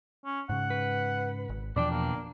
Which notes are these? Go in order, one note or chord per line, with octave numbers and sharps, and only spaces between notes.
C#4
G#2 C#3 F#5
B4
G#1
E2 B2 F3 D4 D5 G5
A#3